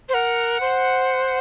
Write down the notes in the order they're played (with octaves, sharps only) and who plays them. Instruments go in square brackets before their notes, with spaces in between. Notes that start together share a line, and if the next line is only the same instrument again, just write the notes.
[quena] C5
[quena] A#4 [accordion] F#5
[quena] C5